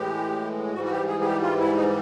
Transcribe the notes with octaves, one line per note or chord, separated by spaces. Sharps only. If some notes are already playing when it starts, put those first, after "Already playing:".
Already playing: A2 E3 G#3 G4
G#2 E3 G3 F#4
F#4
G4
G#4
G#4
G4
F4
E4
D#4